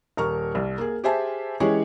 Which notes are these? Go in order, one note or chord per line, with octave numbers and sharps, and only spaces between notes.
D#1 A#4 C#6 F6
C2
A#3 G#4
G4 G#4 C5 E5 G#5 A5
E3 G#3 C#4 G4 G#4 C#5